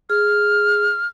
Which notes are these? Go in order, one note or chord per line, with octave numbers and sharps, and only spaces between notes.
G#4 F6